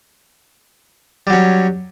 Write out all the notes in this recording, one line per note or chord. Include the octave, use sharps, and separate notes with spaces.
F#3 G3 C#4